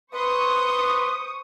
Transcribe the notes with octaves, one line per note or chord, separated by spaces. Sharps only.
B4 C5 C6 C#6 D#6